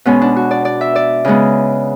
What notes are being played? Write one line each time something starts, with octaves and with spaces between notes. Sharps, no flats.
B2 G#3 B3 C#4
D4
F#4
D5
D5
E5
D5
C#3 G#3 B3